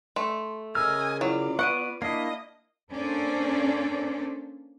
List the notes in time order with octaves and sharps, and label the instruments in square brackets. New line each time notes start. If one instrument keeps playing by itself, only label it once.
[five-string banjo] A3 [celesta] C6
[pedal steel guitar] C#3 A#4 F6 [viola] D#5 G#5 [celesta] E6
[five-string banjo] F#3 [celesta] E4 [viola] F4 D5
[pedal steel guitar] B3 [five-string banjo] F#5 [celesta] C#6 D7 D#7
[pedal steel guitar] A#3 D4 E4 [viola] D#5 [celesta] C7
[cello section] A#3 C#4 D4 A4 C5 D5